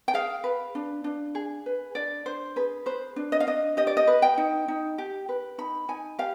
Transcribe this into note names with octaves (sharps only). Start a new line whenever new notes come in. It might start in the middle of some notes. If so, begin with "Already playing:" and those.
G5
G#4 F5
B4
D4
D4
G#4
B4
D4 D5
D4 C5
G#4 B4
B4 C5
D4
D#5
F5
D4 D#5
G4 D#5
D5
D#5
B4
G5
D#4
D#4
G4
B4
D#4 B5
D#4 G#5
G4 F5